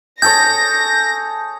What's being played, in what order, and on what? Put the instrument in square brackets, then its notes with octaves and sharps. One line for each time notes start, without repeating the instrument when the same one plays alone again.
[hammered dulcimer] G#4 A4 C#5 [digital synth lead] G6 [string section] A#6